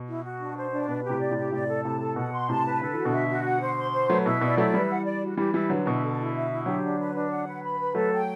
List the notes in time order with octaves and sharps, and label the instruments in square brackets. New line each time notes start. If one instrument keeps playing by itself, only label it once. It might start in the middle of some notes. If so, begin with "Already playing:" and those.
Already playing: [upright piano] B2
[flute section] E4
F#4
D4
C5
D4
[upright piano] B2 [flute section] B4
[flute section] G4
[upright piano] A2 C3
[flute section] D5
[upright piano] A2 C3
[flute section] G4
[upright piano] A2 C3 [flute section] D5
[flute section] A4
[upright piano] A2 C3 [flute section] A5
[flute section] A4
[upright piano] B2 [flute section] F#5
[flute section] C6
[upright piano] A2 C3 [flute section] A5
[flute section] B4
[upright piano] D3 [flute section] A4
[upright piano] E3 [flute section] F#4
[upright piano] B2 D3
[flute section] E5
F#4
F#5
C5
C6
C5
[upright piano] F#3 A3 [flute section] B4
[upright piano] B2 [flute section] E4
[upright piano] B2 [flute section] D5
[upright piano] F#3 A3 [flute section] E4
[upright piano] E3 G3 [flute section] B4
[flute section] F#5
D5
F#4
[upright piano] E3 G3 [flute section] G4
[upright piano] E3 G3 [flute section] E4
[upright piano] D3 F#3 [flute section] B4
[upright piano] B2 D3 [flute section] E4
[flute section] A4
E4
E5
E4
[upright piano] D3 F#3 [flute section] G4
[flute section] D4
B4
D4
F#5
B4
B5
B4
[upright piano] F#3 A3 [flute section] A4
[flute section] G5